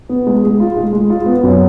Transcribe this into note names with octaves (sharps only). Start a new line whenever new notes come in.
B3
G#3
G#3
F4
G#3
G#3
F4
B3
F#2